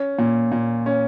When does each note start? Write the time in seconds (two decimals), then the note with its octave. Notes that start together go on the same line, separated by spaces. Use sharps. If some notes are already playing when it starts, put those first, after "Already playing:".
Already playing: C#4
0.19 A#2
0.52 A#2
0.86 C#4